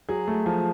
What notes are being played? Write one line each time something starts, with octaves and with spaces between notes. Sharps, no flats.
F#3 G#4
A3
F3